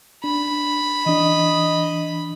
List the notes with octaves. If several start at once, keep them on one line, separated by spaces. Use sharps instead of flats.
D4 B5
E3 D4 D#5